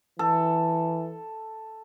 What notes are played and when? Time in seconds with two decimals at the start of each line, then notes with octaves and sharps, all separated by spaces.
0.19 E3 A4